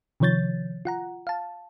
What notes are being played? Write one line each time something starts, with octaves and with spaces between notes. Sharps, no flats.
C3 D#3 F3 C#5 G6 A6
F4 F#5 A#5
F5 A5